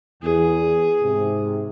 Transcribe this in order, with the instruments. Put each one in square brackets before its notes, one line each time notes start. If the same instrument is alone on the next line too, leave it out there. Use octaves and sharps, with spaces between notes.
[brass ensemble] E2 [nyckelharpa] G#4
[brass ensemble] G#2 C3